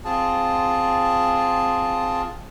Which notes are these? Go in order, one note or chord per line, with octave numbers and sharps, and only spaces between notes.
C4 F4 G#4 A5